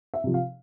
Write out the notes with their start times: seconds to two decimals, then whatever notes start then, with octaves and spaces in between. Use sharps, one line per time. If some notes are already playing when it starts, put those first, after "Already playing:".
0.14 E5
0.24 C3 F3
0.34 F5